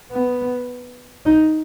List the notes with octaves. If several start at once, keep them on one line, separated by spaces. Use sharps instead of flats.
B3
D#4